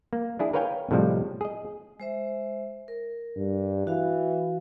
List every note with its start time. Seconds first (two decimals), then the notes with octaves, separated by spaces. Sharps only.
0.13 A#3
0.39 D4 E4 G#4
0.53 A#4 B4 C#5 F5 G5 G#5
0.91 A2 C3 F3 G3 G#3
1.41 G#4 D#5
2.00 G#3 C5 E5
2.88 A#4
3.36 G2
3.87 E3 F#4 F5